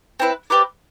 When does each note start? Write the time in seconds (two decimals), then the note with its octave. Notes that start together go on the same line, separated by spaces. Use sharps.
0.20 C4 E4 B4
0.50 C4 G4 B4 D5